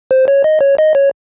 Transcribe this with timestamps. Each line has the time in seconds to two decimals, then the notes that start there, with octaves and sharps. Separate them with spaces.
0.11 C5
0.28 C#5
0.44 D#5
0.61 C#5
0.78 D#5
0.95 C#5